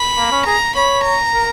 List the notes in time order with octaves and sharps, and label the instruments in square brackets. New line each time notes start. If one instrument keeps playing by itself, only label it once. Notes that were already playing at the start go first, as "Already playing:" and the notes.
Already playing: [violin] B5
[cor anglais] A#3
C#4
[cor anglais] G#4 [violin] A#5
[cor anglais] C#5 [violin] B5
[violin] A#5
[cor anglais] A#4